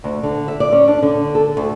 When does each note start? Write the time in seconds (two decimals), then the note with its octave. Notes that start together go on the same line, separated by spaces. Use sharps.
0.04 D2
0.23 D3
0.48 E5
0.60 D5
0.72 C#4
0.88 D4
1.02 D3
1.35 A4
1.57 D2